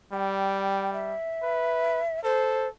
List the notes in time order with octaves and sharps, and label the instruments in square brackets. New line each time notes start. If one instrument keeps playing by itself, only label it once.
[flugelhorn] G3 [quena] G5
[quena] E5
[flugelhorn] B4
[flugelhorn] A4 [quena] C5